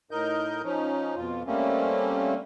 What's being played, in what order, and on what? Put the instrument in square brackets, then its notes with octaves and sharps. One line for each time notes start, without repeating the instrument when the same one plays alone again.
[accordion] A2 D#4 A#4 D#5 G6
F3 C#4 D#4
F2 B2 F4
G3 A3 A#3 C4 C#4